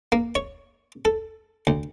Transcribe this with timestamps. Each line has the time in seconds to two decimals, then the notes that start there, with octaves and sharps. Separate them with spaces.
0.12 A#3
0.35 C#5
1.05 A4
1.67 D2